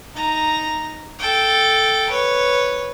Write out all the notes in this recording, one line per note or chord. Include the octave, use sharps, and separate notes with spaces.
D#4 A#5
A4 G5
B4 C#5